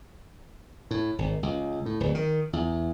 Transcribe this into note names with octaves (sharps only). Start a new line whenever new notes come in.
A2
G#1
C#2
A2
D1
D#3
E2